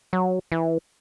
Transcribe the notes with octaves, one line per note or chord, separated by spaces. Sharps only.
F#3
E3